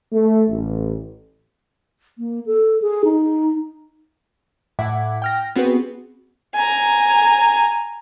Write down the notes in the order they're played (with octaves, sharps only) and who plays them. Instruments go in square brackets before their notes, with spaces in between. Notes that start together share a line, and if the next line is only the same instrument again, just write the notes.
[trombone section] A3
A1
[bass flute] A#3
A4
G#4
D#4
[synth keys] A2 E5 F#5 D6 G#6 B6
G5 F6 A#6
B3 C4 F#4 G#4 B4
[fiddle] G#5 A#5